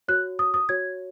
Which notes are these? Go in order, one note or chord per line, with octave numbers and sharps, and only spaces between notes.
F#4 C#5 F#6
D#6
D#6
F#4 C#5 G#6